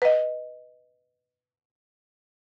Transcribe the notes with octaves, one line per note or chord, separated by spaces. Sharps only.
B4 D#5